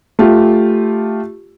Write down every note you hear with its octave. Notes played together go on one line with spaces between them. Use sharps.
A3 F4 G4